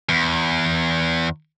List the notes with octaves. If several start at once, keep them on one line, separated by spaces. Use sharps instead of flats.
E2